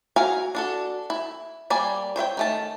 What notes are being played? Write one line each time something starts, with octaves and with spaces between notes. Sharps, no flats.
F#4 A#4 F5 G#5
D4 F#4 A4
E4
G3 A#3 D5 G#5
C5 C#5 E5 G5
D#3 A3 A5